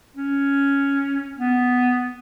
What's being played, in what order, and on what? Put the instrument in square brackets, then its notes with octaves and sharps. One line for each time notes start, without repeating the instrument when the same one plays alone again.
[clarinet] C#4
B3